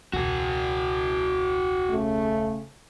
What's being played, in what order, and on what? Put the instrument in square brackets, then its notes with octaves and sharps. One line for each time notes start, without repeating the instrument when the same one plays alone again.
[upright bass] E1 C#2 [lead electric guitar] F#4 G#4
[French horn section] C#3 A3